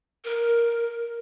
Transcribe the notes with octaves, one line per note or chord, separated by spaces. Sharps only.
A#4